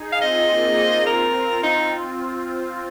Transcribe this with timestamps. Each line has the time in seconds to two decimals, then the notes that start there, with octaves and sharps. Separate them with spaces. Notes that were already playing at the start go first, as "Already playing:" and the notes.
Already playing: D#4 G#4
0.12 F5
0.22 C4 F4 D#5
0.50 A#3 D#4
0.78 C4 F4
1.07 C4 F4 A#4
1.63 D#4